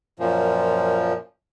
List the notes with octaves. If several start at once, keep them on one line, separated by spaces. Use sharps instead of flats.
F#2 A#2 F3